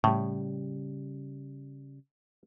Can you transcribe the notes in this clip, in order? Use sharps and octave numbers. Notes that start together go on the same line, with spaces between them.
A2 C#3 G3